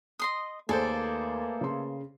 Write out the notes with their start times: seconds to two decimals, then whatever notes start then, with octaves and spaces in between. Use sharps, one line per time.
0.19 D#5 C6 D#6
0.69 D#2 A3 A#3 G#4 A4 B4 C5 D5
1.61 C#3 C6